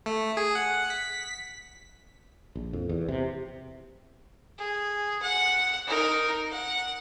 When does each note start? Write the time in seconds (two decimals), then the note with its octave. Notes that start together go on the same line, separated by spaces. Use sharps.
0.06 A3
0.37 G#4
0.55 F#5
0.90 B6
2.56 A#1
2.73 F2
2.89 E2
3.08 C3
4.58 G#4
5.22 F#5
5.87 D#4 A#4
6.52 F#5